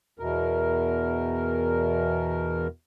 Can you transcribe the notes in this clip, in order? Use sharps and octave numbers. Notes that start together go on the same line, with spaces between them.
E2 B2 A#4